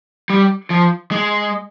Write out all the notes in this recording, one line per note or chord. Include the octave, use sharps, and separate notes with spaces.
G3
F3
G#3